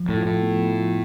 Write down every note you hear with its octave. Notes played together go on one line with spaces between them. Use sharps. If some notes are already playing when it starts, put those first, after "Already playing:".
Already playing: F3
A2
F4
A2
B3
F4